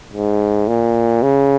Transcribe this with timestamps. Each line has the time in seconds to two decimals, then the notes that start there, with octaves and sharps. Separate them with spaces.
0.13 G#2
0.68 A#2
1.23 C#3